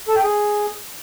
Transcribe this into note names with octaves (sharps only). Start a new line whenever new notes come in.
A4
G5
G#4